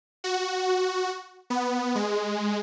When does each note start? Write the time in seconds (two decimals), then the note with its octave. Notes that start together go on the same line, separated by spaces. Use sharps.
0.24 F#4
1.50 B3
1.95 G#3